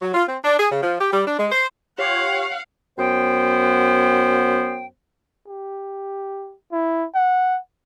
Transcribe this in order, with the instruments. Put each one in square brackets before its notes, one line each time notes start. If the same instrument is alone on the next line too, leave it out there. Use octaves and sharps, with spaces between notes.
[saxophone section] F#3
F4
C4
D4
G#4
C#3
F3
G4
G3
D4
G#3
C5
[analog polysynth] F4 G4 C#5 [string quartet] F5 F#5
[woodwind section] F#2 B3 C5 G5
[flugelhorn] G4
E4
F#5